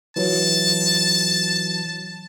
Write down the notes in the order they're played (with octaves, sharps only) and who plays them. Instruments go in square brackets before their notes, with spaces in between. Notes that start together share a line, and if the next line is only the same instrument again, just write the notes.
[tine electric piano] E3 F#3 [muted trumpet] A5